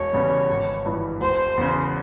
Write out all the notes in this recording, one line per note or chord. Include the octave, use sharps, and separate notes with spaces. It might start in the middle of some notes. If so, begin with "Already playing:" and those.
Already playing: E1 C#5
E2 C#3 G3
G#1
G2 E3
E1 C5
E2 C#3